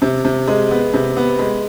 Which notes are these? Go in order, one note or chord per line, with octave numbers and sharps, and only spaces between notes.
C3
C3
G#3
B3
C3
B3
G#3